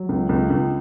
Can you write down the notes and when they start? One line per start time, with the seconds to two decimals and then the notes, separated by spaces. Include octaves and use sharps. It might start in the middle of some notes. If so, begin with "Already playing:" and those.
Already playing: F#3
0.09 C#2
0.29 C#2
0.50 C#2